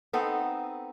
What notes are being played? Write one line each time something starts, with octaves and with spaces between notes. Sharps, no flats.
B3 C4 D#4 A4